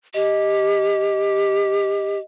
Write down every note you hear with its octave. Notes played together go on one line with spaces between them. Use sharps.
G4 D#5